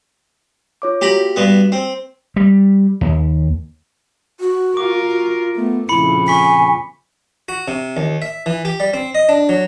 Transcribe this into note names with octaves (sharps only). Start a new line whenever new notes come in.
F4 C#5 D6
A#3 F#4 G4 A#5 B5
G2 B3
C4
G3
D#2
F#4
F4 A#4 D6
F#4
A3 B3
F2 A#2 C#3 E4 B5 C#7
G#5 C#6 B6
F#4
C3
D#2
E5
E3
G4
G3
C4
D#5
D4
F#3